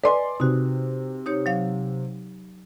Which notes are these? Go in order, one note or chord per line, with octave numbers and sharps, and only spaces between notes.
B4 D5 D#5 G#5 C6
C3 D#4 F#4
D#4 G4 C#5
F#3 F5